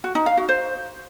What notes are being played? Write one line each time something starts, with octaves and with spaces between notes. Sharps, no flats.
F#4
D#4
F5
F#4
C5